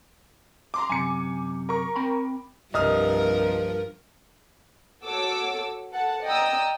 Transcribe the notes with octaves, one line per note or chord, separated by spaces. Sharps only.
A#5 C6 D6
F#2 C3 G#5 C#7
A#4 C#6
C4 G5 B5
C2 G2 F3 A#4 D#5 D#6 F6
F#4 A4 C#5 D6 E6
A4 F#5 A5
D5 D#5 G5 A#5 D#6 E6